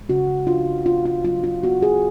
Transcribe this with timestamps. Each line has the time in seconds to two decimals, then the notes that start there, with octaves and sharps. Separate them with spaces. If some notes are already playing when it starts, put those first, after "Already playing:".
Already playing: G#3
0.09 C#3 F#4
0.47 D4 F4
0.86 B3 F4
1.05 F4
1.25 F#3 F4
1.44 F4
1.63 B3 F#4
1.82 G#4